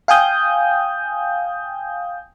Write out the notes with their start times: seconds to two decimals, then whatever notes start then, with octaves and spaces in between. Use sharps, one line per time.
0.08 F5 G5 G#5 D#6 G6